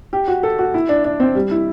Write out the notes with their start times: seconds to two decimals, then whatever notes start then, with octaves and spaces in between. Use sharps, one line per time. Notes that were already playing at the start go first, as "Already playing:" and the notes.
0.13 G4
0.28 F#4
0.43 A4
0.59 F#4
0.74 E4
0.89 D4
1.04 D4
1.20 C4
1.35 G3
1.51 E4